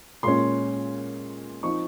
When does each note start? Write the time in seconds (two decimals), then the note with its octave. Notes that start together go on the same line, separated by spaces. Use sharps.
0.23 A#2 G#3 C#4 C6
1.63 F3 C4 D#4 C#6